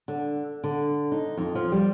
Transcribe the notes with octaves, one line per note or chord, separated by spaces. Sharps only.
D3
D3
D#4
F2
F3
G3